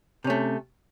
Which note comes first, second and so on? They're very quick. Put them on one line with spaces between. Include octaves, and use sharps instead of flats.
C3 C#4 A3